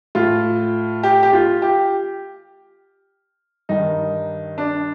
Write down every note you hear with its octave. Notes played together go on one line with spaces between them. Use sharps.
A2 F4
G4
G4
F4
G4
G2 D#3 D#4
D4